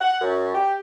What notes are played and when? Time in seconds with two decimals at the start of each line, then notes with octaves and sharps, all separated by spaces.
0.01 F#5
0.21 F#2
0.55 G4